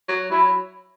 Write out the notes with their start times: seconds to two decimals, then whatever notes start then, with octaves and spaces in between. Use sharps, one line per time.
0.09 F#3
0.31 F#3 E4